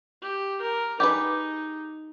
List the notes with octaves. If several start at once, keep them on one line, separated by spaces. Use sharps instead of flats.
G4
A#4
D#4 G4 G#4 B4